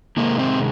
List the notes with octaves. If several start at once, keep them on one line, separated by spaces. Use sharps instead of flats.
C3 D#3 G#3 A#3
C4